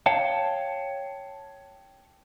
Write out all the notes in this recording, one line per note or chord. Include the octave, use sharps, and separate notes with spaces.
C#5 F5 G5 A5